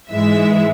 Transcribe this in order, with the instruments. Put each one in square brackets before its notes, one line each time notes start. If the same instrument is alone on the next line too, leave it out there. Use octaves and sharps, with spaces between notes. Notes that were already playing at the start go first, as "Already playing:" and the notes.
[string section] G#2 E3 G#3 E5